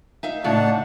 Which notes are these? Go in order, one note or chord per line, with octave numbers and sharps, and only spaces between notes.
D#4 E5 F5
A2 C#3 D4 D#4 F#5 A5